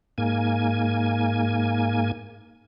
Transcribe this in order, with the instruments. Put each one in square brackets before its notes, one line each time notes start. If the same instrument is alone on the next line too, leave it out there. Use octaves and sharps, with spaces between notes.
[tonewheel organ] G#2 A#3 G#5